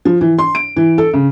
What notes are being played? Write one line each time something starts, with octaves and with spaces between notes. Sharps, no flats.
F3
E3
C6
D7
E3
A4
C#3